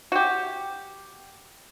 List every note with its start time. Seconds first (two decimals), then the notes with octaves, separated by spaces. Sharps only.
0.12 F#4 G4